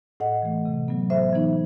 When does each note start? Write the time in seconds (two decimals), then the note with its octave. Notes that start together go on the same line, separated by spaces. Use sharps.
0.20 A2 D#5 F#5
0.42 E3 A3
0.65 C3
0.88 F#3 B3
1.10 A2 C5 E5
1.33 E3 B3 D#4